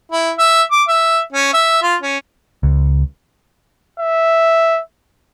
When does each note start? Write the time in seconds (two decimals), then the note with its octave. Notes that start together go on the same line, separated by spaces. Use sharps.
0.12 E4
0.38 E5
0.72 D6
0.88 E5
1.33 C#4
1.54 E5
1.83 F4
2.02 C#4
2.63 C#2
4.00 E5